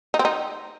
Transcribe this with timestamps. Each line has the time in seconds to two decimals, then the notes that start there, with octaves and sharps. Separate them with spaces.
0.14 D#4
0.19 C4
0.25 D#4